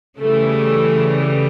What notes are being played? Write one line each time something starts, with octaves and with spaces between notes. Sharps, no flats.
C#3 E3 G3 A3